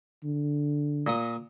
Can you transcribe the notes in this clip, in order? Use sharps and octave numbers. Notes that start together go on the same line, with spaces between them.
D3
A#2 D#6